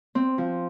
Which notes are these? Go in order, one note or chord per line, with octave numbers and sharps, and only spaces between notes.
C4
F3